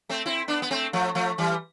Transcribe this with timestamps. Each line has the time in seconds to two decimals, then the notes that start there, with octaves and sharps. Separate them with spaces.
0.09 A3 C4
0.26 C4 E4
0.48 B3 D4
0.62 B3
0.71 A3 C4
0.93 F3 A3
1.15 F3 A3
1.38 E3 G3